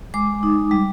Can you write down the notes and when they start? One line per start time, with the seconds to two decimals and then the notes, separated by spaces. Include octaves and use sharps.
0.14 G#3 D6
0.43 D#4
0.71 G3